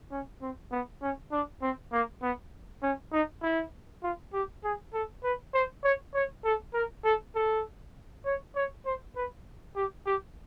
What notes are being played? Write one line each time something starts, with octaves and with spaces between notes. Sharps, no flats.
C#4
C4
B3
C#4
D4
C4
A#3
B3
C#4
D#4
E4
F4
G4
G#4
A4
B4
C5
C#5
C#5
A4
A#4
A4
A4
C#5
C#5
C5
B4
G4
G4